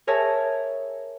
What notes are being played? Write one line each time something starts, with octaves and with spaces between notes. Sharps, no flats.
G#4 A#4 C#5 E5 A5